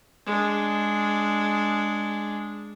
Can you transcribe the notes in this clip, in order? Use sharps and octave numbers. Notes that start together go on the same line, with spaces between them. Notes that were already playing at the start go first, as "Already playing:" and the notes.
G#3 D4